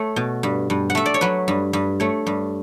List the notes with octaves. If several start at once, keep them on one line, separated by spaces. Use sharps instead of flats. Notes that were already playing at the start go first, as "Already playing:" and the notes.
Already playing: A3 C#5
B2
G2
G2
F#5
A3 E5
D5
C#5
F#3 B4
G2
G2
A3 C#5
G2